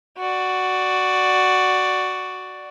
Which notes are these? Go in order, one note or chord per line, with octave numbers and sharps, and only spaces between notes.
F#4 D5